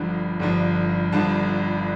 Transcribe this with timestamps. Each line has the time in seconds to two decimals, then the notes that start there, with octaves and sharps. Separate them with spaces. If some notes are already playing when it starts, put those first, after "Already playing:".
Already playing: G1 G2 D3 F3
0.40 G1 G2 D3 F3
1.12 G1 G2 D3 F3 A5